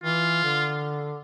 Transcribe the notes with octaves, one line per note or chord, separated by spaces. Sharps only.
E3 F4
D3